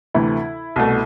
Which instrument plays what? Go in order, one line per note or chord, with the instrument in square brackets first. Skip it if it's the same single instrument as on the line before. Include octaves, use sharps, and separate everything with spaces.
[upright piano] D2 C3 E3 A3 E4
C2 B2 A3